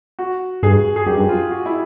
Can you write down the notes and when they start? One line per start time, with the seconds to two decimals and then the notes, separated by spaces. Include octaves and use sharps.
0.19 F#4
0.63 G2 G#4
0.96 G#4
1.07 F#2 G4
1.16 G2
1.25 F#2
1.29 F4
1.51 F#4
1.66 E4